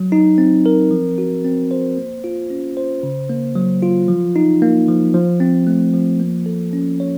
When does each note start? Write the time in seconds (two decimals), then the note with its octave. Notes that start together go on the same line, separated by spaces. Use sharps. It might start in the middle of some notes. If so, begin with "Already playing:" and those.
Already playing: F#3
0.12 D#4
0.38 C4
0.66 A#4
0.91 F3
1.18 F#4
1.45 C4
1.71 C5
1.97 A#3
2.24 F4
2.50 C#4
2.77 C5
3.03 C#3
3.30 A#3
3.55 F#3
3.83 F4
4.08 F3
4.36 D#4
4.62 A#3
4.89 F3
5.14 F3
5.40 C4
5.67 A3
5.94 F3
6.20 A#3
6.46 A4
6.73 C#4
7.00 C#5